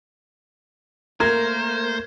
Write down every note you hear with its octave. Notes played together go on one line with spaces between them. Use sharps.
A3 A#3 A#4 C5 G#6